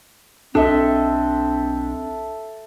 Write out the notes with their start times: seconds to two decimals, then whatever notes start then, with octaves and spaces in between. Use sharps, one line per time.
0.55 B1 C4 D4 A4 D#5 E5